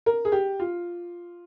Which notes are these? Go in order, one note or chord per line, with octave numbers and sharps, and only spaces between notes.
A#4
G#4
G4
F4